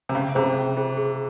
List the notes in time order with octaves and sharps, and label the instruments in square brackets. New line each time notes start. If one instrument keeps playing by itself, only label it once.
[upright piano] C3
[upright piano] C#3 [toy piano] C#4
[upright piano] C3 [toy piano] F4 G#4 C5
[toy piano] C#4
F4 G#4 C5
G#4